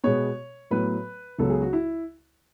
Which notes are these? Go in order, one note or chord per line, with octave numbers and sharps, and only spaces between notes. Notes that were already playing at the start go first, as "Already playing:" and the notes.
B2 G#3 B3 C#5
A2 F#3 B3 B4
C#2 C#3 F#3 B3 A4
G#4
F#4
E4